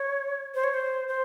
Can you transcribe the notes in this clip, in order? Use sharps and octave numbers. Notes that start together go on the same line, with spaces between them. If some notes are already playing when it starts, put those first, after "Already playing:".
Already playing: C#5
C5
C#5
C5
C5